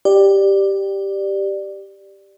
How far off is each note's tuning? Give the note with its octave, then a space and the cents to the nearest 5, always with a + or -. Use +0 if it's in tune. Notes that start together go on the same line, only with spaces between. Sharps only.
G4 +0 D5 +10